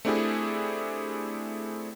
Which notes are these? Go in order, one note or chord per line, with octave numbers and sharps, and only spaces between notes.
A3 C4 D4 E4 G4 G#4